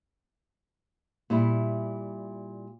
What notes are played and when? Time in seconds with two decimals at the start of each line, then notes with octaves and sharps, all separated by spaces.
1.30 A#2 G3 E4